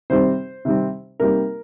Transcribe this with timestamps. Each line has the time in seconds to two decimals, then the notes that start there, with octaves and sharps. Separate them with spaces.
0.10 C3 D#3 G3 C4 C5
0.65 C3 D#3 G3 C4
1.20 C3 G3 A#3 D#4 A#4